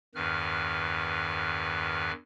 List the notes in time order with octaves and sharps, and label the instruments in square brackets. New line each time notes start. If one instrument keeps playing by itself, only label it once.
[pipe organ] E2 G2 D#3 B4 F6